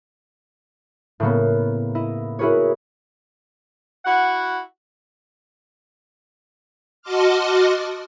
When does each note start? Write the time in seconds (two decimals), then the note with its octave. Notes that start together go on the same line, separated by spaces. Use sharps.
1.20 A2 C#3 A#3 B3
1.95 E4 D#5
2.39 E4 F#4 G#4 A#4 B4 C#5
4.05 E4 F#4 F#5
7.02 F#4 D#5 A5 C6 D6 F6